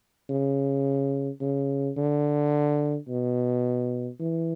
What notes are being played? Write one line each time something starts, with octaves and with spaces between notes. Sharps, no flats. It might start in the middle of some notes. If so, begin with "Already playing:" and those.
C#3
C#3
D3
B2
E3